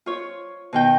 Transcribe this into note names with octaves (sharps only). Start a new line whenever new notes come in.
F4 C#5
B2 D#3 G5